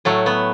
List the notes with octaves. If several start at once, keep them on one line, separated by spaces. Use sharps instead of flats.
A2 F#3 A3
B3